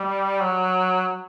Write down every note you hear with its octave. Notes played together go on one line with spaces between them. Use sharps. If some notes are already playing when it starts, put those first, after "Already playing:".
Already playing: G3
F#3